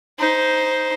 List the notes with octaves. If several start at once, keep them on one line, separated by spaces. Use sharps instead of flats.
D#4 C5